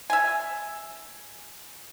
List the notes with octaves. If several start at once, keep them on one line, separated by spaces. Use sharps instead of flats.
E5 G#5